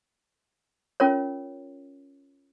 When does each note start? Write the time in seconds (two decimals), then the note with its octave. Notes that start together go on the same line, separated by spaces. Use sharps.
1.00 C#4 F4 A#4 C#5